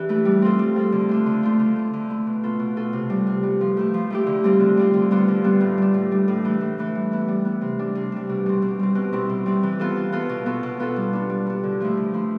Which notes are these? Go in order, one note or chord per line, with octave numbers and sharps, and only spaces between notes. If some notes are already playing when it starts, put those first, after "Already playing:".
Already playing: E3 D4 G4
A3 E4
G3
C4 F4 A4
G3
C4 F4 A4
D3
A3 D4 F4
D3
A3 D4 F4
D3
A3 E4
D3
A3 E4
B2
B3 F4 A4
B2
B3 F4 A4
C3
G3 B3
C3
G3 B3
F3
A3 E4 G4
F3
A3 E4 G4
D3
G3 C4 F4
D3
G3 C4 F4
D3
G3 B3 D4 F4
D3
G3 B3 D4 F4
A2
G3 D4
A2
G3 D4
A2
E3 A3
A2
E3 A3
G3
B3 E4
G3
B3 E4
C3
G3 D4
C3
G3 D4
B2
G3 C4
B2
G3 C4
B2
G3 C4 E4
B2
G3 C4 E4
E3
B3 F4 A4
E3
B3 F4 A4
B2
B3 F4 A4
B2
B3 F4 A4
G3
B3 D4
G3
B3 D4
D3
F3 A3 E4
D3
F3 A3 E4